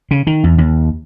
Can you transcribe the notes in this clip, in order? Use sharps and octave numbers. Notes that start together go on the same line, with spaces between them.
C#3
D#3
E2
D#2